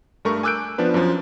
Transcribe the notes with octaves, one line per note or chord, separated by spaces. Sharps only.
G2 A3 A#4 C#6
G#5 D6 E6 F#6 G6 D7
F3 B3 D4 B4
F#2 F3